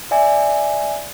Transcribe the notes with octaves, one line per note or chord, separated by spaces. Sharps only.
D5 E5 G#5